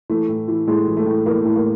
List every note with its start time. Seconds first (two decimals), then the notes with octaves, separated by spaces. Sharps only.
0.10 E3 A3
0.29 A2
0.48 E3
0.68 A2 G#3
0.87 E3
0.97 A3
1.06 A2
1.26 E3 A#3
1.45 A2
1.56 A#3